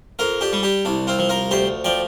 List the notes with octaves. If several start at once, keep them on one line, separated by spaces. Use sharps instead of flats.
F2 F4 A#4
D4 G4
G3
D4 G4
C2 D4
C4 F4
F3
F4 A#4
D2 G4 C5
F3 D5 G5